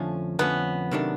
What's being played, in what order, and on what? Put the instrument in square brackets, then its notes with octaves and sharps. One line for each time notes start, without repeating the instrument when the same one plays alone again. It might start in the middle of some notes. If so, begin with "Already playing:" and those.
Already playing: [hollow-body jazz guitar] F2 D3 F3 A3 C#4
[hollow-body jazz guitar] F2 D3 F3 A3 C#4 [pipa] B3
[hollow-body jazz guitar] C3 D#3 F#3 A3 D4